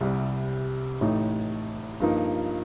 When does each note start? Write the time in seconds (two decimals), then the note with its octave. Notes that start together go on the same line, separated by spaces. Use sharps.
0.01 C2 C3 G3
1.01 A1 A2 A3 D#4
2.00 G2 F3 A#3 D#4